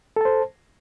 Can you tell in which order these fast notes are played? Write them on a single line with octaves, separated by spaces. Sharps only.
A4 A5 C5